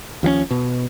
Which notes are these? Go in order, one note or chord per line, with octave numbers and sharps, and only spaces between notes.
D#2 F3 B3 C#4
B2